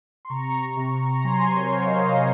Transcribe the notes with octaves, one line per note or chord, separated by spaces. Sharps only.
C6
C3 A#5 C#6
C3
A#5
F#3 G#5 C6
C5
A#4 C#5
F#3
F5
C5 D#5